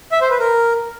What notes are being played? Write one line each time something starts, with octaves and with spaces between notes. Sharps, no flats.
E5
C5
B4
A#4